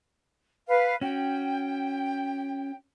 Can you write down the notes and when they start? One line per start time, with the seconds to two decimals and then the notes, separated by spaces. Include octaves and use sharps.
0.68 B4 F5
1.01 C#4 F#4 G5